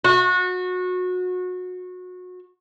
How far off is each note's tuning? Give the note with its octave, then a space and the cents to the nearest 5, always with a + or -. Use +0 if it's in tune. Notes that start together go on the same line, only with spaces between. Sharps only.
F#4 -25